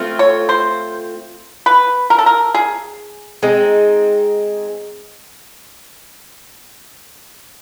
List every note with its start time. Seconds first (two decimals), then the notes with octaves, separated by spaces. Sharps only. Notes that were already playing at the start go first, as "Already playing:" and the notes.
Already playing: A3 C4 F4
0.19 C#5
0.49 C5
1.66 B4
2.10 A#4
2.18 A4
2.26 A#4
2.55 G#4
3.42 G#3 C4 D#4